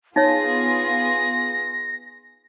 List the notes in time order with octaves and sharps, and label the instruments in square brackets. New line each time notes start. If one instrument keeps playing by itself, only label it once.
[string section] B3 F4 G#4 [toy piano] D#4 C#5 [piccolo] A#6